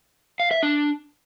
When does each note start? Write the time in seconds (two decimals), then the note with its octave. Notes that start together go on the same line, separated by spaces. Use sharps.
0.40 F5
0.51 E5
0.63 D4